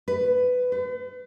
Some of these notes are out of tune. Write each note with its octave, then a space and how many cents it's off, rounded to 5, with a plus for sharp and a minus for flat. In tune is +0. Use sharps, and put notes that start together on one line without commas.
B4 +15
B4 +45